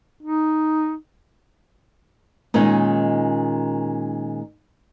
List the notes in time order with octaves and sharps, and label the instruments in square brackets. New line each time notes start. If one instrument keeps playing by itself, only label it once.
[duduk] D#4
[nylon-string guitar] A#2 D#3 G#3 C#4 D#4